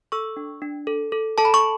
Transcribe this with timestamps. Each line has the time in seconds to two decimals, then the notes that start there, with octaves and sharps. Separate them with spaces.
0.12 A4 C#6 E6
0.37 D4
0.62 D4
0.87 A4
1.12 A4
1.38 A4 A5
1.45 B5
1.54 C#6